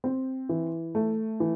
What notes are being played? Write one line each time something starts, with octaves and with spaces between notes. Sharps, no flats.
C4
E3
A3
E3